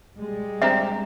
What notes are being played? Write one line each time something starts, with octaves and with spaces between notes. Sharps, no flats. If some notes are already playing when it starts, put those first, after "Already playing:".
G3 G#3
C4 D4 G4 E5 A#5